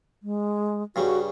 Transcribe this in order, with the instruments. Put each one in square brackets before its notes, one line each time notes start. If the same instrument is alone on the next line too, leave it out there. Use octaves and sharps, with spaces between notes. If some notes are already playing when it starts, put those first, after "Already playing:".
[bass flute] G#3
[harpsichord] G2 C#3 G3 [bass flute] F#4